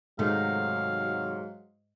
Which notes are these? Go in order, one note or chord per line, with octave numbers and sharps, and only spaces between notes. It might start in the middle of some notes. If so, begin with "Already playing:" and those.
G#2 C3 D#3 F#3 A3 F5